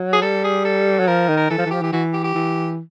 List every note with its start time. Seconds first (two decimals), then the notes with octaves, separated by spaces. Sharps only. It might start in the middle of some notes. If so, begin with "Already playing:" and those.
Already playing: F#3
0.13 G#4
0.22 G3 A4
0.44 G#4
0.65 A4
0.99 F#3
1.08 F3 A#4
1.29 D#3
1.37 A#4
1.50 E3 A4
1.58 F3
1.66 E3
1.71 F3 G4
1.81 E3 G4
1.93 E3 F#4
2.13 G4
2.24 G4
2.35 E3